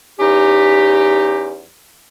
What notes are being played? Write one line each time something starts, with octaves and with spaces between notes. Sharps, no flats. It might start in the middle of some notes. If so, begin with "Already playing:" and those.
E2 C#4 D#4 G4